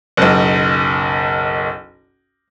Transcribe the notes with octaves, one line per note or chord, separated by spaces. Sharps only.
F#1 B1